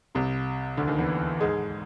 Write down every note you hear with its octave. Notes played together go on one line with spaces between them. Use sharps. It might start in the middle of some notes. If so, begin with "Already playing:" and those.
C2 C3
D2 D3
D#2 D#3
E2 E3
G#2 G#3